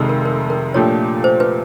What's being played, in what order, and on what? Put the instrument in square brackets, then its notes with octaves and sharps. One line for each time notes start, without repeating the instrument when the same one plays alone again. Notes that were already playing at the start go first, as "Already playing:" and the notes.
Already playing: [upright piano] F1 F2 C3 D#3 G#3
[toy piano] A#4
A#4
A#4
[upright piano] A#2 F3 A3 D4 G4 [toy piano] C#5
[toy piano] C5
B4